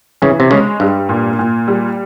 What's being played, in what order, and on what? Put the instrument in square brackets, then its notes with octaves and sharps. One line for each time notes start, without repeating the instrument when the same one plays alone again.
[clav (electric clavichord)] C#3 [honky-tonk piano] E3
[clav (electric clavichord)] C3
[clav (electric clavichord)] C#3 [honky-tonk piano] G#3
[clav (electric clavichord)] G2 [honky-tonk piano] G3
[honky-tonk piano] A#2
A#2
G3